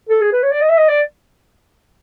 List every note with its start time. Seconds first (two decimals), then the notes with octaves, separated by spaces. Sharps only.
0.09 A4
0.21 G#4
0.33 B4
0.43 C#5
0.52 D5
0.61 D#5
0.69 E5
0.78 D#5
0.88 D5